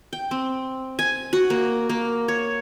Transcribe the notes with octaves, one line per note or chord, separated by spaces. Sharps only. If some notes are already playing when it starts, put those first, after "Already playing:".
G5
C4
G#5
F#4
A#3
A#3
C#5